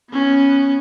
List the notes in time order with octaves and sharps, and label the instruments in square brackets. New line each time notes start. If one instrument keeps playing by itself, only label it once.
[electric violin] B3 C#4